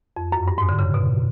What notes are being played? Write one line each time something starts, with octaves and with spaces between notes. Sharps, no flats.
F2
F#2
G2
G#2
D3
C#3
B2